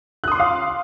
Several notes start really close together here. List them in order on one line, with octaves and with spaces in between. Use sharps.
F#6 D#6 C6 D6 F5